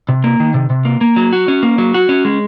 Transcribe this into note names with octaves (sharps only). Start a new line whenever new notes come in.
C3
A#3
D#3
C3
C3
A#3
A#3
F#3
F#4
C#4
A#3
F#3
F#4
C#4
G#3